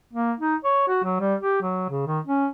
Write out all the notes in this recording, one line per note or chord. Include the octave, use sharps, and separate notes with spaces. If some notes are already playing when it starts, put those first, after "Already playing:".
A#3
D#4
C#5
F#4
F#3
G3
G4
F#3
C#3
D#3
C#4